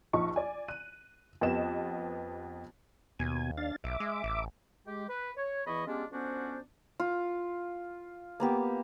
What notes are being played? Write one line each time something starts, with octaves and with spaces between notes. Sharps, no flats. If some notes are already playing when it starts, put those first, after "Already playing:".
A#1 F3 D#4 C#6
D5 G#5
F#6 D#7
F2 B3 G4 D#5 E7
D#2 B2 G#5
D4 F5 A6
B1 E5 D6
G#3
A1
G#3 G4
B4
C#5
E2 E3 E4 D#5 B5 C#6
G#3 B3 C#4 D4 F4 G4
F2 B3 C#4 D4 F#4 C5
F4
A#3 B3 G4